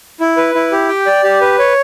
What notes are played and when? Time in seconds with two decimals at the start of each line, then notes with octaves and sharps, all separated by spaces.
0.20 E4
0.37 B4
0.55 E4
0.72 G4
0.89 G5
1.06 D5
1.24 G4
1.41 B4
1.59 C#5